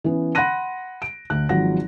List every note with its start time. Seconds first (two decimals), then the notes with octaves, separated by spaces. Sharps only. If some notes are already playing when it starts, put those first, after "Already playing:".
0.04 E3 B3 C#4
0.35 F#5 B5 C6 F#6 A#6 D#7
1.02 D7
1.30 D2 F#6
1.49 G#1 F3 F#3 F#5 A#6